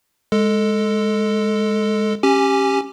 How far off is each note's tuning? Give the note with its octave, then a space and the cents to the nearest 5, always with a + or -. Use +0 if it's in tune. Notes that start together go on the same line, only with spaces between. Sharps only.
G#3 +0 A4 +5
C#4 -20 G4 +0 G#5 +0